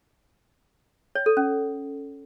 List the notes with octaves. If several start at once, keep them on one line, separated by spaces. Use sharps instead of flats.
C#5
A4
C#4